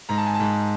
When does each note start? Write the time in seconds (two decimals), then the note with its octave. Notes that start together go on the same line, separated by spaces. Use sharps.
0.09 G#2 A#5
0.18 A5
0.26 G#5
0.34 A5
0.40 G#2